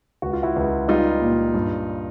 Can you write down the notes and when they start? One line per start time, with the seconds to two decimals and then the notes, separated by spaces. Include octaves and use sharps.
0.22 C#2 F#4
0.33 F4
0.43 E4 F#4
0.56 C#2
0.88 G3 D#4 F4
1.21 A#2
1.54 G2